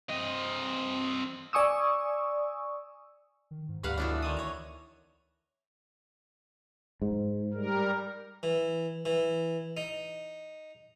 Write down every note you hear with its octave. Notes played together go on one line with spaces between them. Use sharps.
C4 D#5
D5 G#5 C#6 D#6 E6
D#3
G#2
D2 G2 B4 F5 F#5
B1 A2 E3 B3 D4
D3 D#3 D#6
C#5 A#5
G#2
G3 A#4
E3
E3
D#4